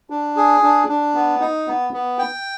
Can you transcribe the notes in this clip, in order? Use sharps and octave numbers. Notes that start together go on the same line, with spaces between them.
D4
G#4
D4
D4
B3
D#4
B3
B3
G5